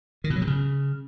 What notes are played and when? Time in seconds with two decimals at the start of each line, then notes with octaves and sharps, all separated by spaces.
0.24 D#3
0.30 B2
0.36 F#3
0.42 C3
0.47 C#3